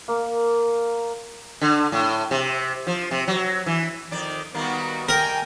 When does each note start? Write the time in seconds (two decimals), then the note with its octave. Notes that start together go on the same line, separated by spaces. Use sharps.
0.08 A#3
1.61 D3
1.92 A2
2.31 C3
2.87 F3
3.11 C3
3.28 F#3
3.66 E3
4.11 F2 D#3 D5
4.54 D#3 G3 A#3 B3 F#4
5.09 A#4 G5 G#5